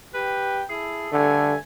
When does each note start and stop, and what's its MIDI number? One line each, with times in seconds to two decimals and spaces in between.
0.14 0.62 67
0.14 0.62 71
0.14 0.62 79
0.70 1.09 64
0.70 1.09 68
0.70 1.09 69
1.12 1.57 43
1.12 1.54 50
1.12 1.57 57
1.12 1.57 80